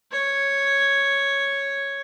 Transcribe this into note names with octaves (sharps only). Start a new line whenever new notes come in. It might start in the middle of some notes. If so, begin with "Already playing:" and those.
C#5